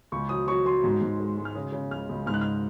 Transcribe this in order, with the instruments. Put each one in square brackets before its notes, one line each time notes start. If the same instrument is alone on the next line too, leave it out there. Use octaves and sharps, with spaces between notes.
[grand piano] C#2 C#6
F#3 D#6
F#3 C#6
F#3 C6
G#2
G#2
G#3
G#3
F6
C#3 D#6
C#3
C#2 F6
C#2
G#2 F6
F#6
F6